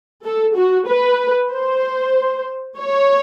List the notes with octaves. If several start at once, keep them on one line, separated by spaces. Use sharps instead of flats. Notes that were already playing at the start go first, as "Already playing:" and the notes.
A4
F#4
B4
C5
C#5